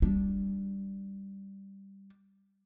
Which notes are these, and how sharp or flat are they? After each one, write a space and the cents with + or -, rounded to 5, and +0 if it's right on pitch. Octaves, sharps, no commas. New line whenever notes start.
G3 +0 D4 -5